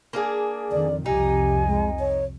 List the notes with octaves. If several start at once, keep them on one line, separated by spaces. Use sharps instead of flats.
A#3 D4 G#4
F2 D3 D#3 D5
C2 F2 C3 D#4 G4 G#5
G#3
C#5